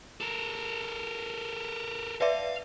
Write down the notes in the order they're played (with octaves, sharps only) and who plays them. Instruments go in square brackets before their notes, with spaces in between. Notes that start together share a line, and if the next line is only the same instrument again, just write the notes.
[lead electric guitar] A4 A#4
[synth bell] B4 D5 E5 [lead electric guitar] F5